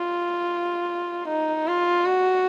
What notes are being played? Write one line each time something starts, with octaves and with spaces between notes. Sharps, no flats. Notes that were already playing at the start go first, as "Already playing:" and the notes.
Already playing: F4
D#4
F4
F#4